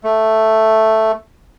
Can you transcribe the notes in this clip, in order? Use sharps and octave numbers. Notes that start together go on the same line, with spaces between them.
A3